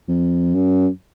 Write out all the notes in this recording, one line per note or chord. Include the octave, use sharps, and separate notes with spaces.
F2
F#2